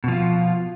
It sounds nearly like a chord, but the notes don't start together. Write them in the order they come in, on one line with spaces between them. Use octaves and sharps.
B2 F3 F4